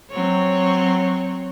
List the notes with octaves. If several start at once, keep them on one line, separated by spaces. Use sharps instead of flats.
F#3 C4 C#5